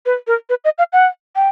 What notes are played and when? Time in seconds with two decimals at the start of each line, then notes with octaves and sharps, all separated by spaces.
0.06 B4
0.27 A#4
0.50 B4
0.65 D#5
0.78 F5
0.93 F#5
1.36 G5